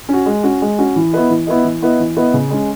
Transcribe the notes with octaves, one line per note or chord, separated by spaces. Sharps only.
C#4 F#4
G#3
C#4 F#4
G#3
C#4 F#4
E3
B3 E4 B4 D#5
E3
B3 E4 B4 D#5
E3
B3 E4 B4 D#5
E3
B3 E4 B4 D#5
C#3
G#3 C#4